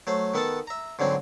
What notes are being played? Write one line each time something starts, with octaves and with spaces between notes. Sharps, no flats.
F#3 A3 C5
D#3 B3 A4 F#5 A5
E5 A#5
G#2 D3 F#3 C4